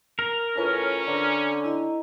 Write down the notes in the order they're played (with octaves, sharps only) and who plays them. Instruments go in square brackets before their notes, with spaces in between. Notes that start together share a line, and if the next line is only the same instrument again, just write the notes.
[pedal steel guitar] A#4
[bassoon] A2 [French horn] C#4 [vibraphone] F4 B4
[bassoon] D3 [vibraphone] A#5
[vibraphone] E4 D#5 A#5